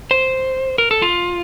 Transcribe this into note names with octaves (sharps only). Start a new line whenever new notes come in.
C5
A#4
A4
F4